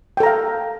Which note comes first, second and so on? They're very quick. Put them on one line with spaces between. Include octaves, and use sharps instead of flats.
G5 A4 A#5 F5